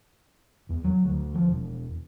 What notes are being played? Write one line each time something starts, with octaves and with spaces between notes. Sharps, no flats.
E2
F#3
D2
F3
E1